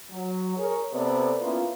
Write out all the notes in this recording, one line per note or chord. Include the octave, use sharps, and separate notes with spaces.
F#3
G#4 A#4 C#5
C3 B3 A4 B4 C5 D5
A#3 B3 C#4 E4 F4